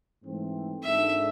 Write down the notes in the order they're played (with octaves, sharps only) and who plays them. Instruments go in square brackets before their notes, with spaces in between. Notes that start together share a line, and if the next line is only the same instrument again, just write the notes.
[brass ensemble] G#2 E3 A3 C4
[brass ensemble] G#1 G#2 G#3 D4 A4 [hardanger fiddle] E5